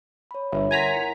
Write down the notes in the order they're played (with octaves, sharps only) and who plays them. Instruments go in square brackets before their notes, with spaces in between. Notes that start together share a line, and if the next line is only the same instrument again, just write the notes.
[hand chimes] C#5 B5
[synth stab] G1 [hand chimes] C#5 E5
[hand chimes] A#4 F#5 C6 [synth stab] G#5 A#5 B6
[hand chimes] E4 C#7